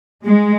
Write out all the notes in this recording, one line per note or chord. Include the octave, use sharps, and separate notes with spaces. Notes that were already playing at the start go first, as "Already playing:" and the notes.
G#3